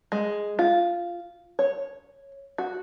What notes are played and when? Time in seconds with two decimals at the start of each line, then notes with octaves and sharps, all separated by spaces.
0.12 G#3
0.59 F4
1.59 C#5
2.58 F#4